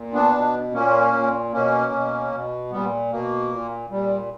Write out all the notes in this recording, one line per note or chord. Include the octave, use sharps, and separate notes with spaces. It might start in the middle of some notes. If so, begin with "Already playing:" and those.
Already playing: A#2
B3 D4
B2
A#2 A#3 C#4
A#2
B2 A#3 C#4
B2
B2
A#2 G3 B3
B2 A#3
A#2
A#2 G3